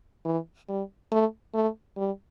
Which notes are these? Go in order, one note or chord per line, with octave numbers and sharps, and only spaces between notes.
E3
G3
A3
A3
G3